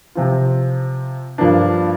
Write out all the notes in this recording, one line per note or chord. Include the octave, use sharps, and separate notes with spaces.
C3 F3 C4 F4
G2 F3 A#3 D4